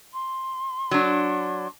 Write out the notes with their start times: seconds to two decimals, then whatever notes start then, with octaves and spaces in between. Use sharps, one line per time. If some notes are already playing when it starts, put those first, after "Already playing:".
0.13 C6
0.91 F#3 D4